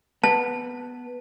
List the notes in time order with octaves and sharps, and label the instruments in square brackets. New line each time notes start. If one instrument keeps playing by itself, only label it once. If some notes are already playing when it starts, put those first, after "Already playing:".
[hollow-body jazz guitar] B3 [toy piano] A5